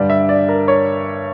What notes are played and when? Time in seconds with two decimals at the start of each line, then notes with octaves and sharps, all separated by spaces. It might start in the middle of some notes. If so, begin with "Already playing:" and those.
Already playing: G2 D3 G3 D5
0.10 E5
0.29 D5
0.49 A#4
0.68 C#5